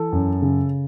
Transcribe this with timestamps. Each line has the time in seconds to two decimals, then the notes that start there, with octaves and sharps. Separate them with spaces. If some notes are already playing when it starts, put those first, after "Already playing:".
Already playing: E3 A4
0.12 F#2
0.42 C#3